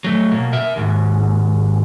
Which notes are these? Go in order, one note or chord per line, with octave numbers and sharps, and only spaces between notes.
F#3 A3
B2 A#3
A#4 E5
D#2 G#2